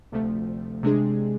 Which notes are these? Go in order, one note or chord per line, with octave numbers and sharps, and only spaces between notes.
D2 C3 F3 A3
C3 G#3 D4 G#4